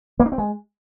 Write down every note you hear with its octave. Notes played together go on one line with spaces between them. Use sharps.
A#3
D4
C4
G#3